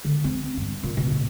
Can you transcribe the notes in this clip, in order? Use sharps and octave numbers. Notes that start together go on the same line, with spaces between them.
D3
C4
G2
A#2
B2
A2